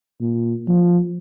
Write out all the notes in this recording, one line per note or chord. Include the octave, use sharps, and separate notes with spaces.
A#2
F3